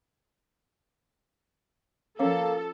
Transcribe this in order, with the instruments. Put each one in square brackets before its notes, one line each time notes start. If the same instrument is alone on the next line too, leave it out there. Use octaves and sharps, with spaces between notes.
[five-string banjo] F3 C#4 [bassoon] A#3 [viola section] A4